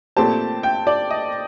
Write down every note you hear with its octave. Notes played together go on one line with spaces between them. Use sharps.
A#2 A3 C4 G4 C5 A5
G5
D5
D#5